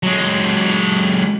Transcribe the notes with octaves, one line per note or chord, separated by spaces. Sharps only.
F#3 G#3